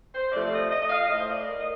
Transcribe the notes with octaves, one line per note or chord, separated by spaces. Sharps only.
C5
C3 F3 A3 D5
D#5
D#5
D#5
F5
A2 A3 D#5
C5
D5
A#4
D#5